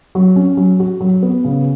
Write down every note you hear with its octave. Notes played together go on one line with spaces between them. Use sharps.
F#3
C#4
F#3
F#4
F#3
B3
C#3